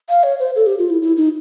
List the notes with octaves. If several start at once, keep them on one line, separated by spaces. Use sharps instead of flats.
F5
C#5
C5
A4
G4
F4
E4
E4
D#4